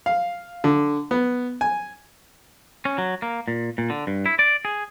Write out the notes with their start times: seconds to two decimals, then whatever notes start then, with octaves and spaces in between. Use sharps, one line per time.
0.06 F5
0.64 D3
1.11 B3
1.61 G#5
2.85 C#4
2.98 F#3
3.22 A#3
3.48 A#2
3.78 A#2
3.90 D3
4.07 G2
4.26 E4
4.39 D5
4.65 G#4